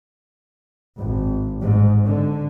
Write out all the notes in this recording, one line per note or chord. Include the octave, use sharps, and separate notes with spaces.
G#1
G#2
D3